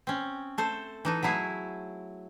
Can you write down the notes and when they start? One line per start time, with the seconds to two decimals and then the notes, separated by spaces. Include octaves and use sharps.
0.07 C4 C#4
0.58 A3 A4 C5
1.05 E3 D#4 A4
1.23 F#3 A3 E4 G#4